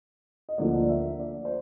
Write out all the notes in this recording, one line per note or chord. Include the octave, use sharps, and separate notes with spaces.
D#5
D2 D3 F3 A#3 D5
E5
D5
C5